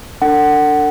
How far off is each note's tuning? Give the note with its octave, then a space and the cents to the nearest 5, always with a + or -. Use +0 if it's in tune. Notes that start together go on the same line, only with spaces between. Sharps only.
D4 +0 A4 +40 F#5 +20